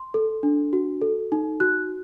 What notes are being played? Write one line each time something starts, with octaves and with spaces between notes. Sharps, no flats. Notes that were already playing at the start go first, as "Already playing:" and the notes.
Already playing: C6
A4
D4
F#4
A4
D#4
F#4 F#6